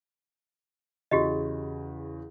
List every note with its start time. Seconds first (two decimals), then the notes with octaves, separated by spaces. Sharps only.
1.11 E2 C#3 F#4 G4 D#5